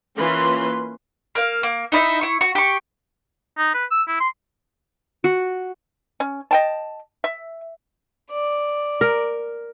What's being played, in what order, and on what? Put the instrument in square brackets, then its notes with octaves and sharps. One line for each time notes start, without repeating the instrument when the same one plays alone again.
[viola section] E3 A#3 C#4 F4 B4 C6
[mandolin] A#3 F5
A#3
D#4 E4 D#5 E5
E4 C#6
F#4
G4 C#6
[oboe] D#4
B4
E6
E4
C6
[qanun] F#4
[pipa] C#4
D#5 G5 A5
E5
[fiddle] D5
[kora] A#4